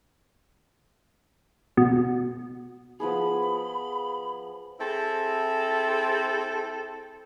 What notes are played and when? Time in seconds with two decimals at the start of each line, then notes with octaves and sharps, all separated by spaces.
1.77 B2
3.00 F3 B3 G#4 B5
4.80 C4 E4 G#4 A4